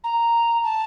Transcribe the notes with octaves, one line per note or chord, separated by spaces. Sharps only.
A#5
A5